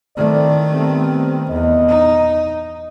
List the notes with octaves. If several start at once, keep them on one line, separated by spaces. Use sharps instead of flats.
A2 D#3 A3 C4 D5
G3 B3 C4
E2 D#5
D#4